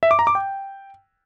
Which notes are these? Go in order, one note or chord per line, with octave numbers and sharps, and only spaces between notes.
E5
D6
A#5
D6
G5